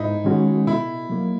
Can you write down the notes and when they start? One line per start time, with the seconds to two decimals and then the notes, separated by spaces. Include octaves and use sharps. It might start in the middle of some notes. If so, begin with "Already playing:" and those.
Already playing: G#2 D#4 E4
0.24 D#3 G#3 C#4 F#4
0.66 B2 E4
1.09 F#3 A#3